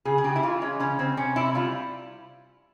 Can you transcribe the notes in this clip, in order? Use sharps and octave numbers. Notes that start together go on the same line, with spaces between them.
C#3 G#4
G#4
C#3 G4
E4
E3 F4
G#3 C#4
C#3 C#4
C#3 C4
C3 C#4
C3 E4
G3 F4